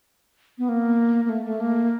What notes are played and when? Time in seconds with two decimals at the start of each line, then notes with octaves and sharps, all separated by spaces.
0.58 B3
0.69 A#3
1.25 A#3
1.29 A3
1.45 A3
1.60 A#3